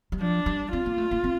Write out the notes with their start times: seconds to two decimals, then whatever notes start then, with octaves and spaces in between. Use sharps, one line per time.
0.12 G3
0.20 F3 D4
0.46 G3
0.73 C4 F4
0.86 A#3
0.98 A3
1.11 A#3
1.24 C4